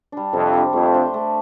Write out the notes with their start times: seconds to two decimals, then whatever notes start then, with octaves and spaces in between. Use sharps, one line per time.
0.12 G3 D4
0.33 F2 C3
0.53 G3 D4
0.73 F2 A3
0.94 D4 G4 C5
1.14 A3